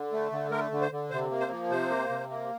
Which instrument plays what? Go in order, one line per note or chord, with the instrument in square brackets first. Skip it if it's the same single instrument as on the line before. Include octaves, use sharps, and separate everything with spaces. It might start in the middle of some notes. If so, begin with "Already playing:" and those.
Already playing: [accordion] D3
A3
D3
A3 A#4
D3
C5
D3
C3 C5
A#3
C5
F3
C3 C5
A#3
C3
A#3